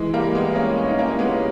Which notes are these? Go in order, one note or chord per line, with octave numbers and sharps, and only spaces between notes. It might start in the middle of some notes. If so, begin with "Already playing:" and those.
Already playing: E3 G#3
G3 A#3
G#3 B3
A#3 C#4
C#4
D#4
A#3 C#4
G#3 B3